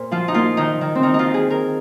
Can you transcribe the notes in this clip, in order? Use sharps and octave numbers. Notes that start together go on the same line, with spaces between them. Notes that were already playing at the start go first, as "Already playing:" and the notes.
Already playing: A#2 A#4 C5
F3 F4
D#4
A#3 F4
D#3 D#4
D#3
C4
D#3 D#4
D#4
F4
D#3
G#4
D#3 A#4